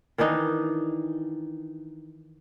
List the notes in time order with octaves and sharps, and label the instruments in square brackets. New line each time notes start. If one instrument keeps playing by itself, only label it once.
[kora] D#3 E3 D4 D#4